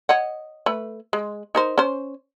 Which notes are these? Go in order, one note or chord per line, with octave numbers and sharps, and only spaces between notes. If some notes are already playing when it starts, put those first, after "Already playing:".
C#5 D#5 F#5
A3 B4
G#3
D#4 A#4 C5
C#4 C5